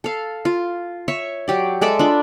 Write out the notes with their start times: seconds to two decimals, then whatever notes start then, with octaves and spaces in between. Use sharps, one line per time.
0.04 A4 F5
0.45 F4
1.08 C#5 E5 C#6
1.48 F#3 G4 D5
1.81 G#3 A4 D5 E5
1.99 D4 F4 B5